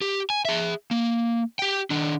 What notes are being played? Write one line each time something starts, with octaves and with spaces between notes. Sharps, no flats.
G4
G#5
G#4 E5
A#3
G4 G5
D#3 D4